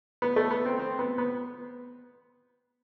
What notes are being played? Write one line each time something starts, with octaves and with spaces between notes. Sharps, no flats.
B3
A3
B3
C4
C4
B3
B3